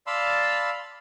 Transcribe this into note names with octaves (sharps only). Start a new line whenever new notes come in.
D5 F5 A5 B5 C6 E6